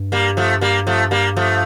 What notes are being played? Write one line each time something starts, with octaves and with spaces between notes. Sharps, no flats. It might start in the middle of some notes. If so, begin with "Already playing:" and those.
Already playing: G2
G3 A#3
F3 A3
G3 A#3
F3 A3
G3 A#3
F3 A3